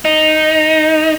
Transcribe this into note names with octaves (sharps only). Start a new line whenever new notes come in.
D#4